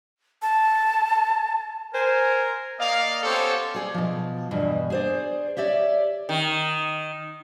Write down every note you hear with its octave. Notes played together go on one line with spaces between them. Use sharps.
A5
A#4 C5 G#5
A#3 D5 D#5 F5
B3 C#4 G4 A4 C5 C#5
G#4 D5
B2 F3
E2 G2 B2
G#4 C5 D5
G4 C#5 D5 E5
D#3